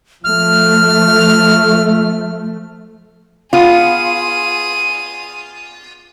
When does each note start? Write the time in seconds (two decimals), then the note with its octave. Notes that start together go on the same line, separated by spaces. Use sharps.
0.24 F3 A3 F6
3.53 B3 F4 G#4 D#7